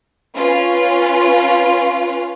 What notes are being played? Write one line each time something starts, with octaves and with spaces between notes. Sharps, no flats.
C#4 F4 B4